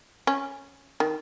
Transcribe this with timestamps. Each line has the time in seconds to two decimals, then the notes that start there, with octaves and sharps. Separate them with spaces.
0.27 C#4
1.00 D#3